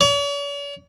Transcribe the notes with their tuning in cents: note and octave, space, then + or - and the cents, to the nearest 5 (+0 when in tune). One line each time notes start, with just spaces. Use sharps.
C#5 +45